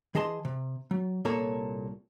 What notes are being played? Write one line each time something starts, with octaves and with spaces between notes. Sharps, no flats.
E3 G#4 D#5 A5 C6
C3
F#3
C2 A#2 A#3 A4 C#5 A#5